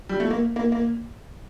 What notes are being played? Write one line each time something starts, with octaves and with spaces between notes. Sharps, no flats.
G3
A3
A#3
A#3
A#3